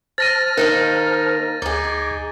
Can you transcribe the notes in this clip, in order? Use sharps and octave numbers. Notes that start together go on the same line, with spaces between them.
C5 A5 F6 A6 A#6 D#7
D#3 A#3 D#4 A#4
D2 D#4 G#4 D6 G#6